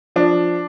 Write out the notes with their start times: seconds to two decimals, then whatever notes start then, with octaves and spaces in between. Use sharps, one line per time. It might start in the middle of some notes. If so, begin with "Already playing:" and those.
0.16 F3 D4